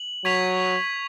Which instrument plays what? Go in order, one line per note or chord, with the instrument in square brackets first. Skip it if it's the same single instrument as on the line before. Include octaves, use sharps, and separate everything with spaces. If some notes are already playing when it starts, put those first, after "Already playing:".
Already playing: [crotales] F#7
[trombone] F#3 [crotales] C#6 G#6 B6 F7